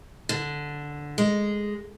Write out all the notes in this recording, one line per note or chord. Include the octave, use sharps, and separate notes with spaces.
D3
G#3